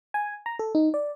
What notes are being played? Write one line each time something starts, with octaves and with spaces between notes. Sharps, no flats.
G#5
A#5
A4
D#4
D5